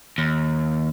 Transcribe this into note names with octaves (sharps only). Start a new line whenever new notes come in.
D#2